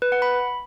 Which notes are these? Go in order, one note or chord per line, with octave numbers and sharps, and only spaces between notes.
B4
F#5
B5